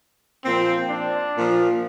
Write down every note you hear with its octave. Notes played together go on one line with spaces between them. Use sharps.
A#2 F3 C4
D4
A#2 F3